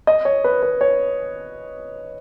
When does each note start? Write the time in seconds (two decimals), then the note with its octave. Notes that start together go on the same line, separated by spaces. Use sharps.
0.07 D#5
0.25 C#5
0.44 B4
0.63 B4
0.81 C#5